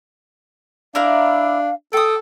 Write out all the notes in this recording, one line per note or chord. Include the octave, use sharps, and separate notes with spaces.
D4 E4 A#4 D5 F5
A4 G5 D#6